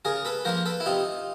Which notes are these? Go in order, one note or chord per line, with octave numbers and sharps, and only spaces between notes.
C#3 G#4 A#4
A4 B4
F3 A#3 A#4 C5
A4 B4
E4
C3 D#4 F4